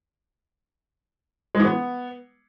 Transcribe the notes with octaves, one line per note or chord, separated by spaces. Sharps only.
G#3
E3
B3